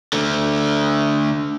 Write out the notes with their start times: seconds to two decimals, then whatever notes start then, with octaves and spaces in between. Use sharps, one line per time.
0.13 D3 A3